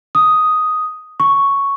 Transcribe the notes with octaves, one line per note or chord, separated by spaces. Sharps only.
D#6
C#6